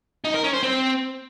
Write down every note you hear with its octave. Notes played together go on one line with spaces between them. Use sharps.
D#4
A#4
C#4
C5
C4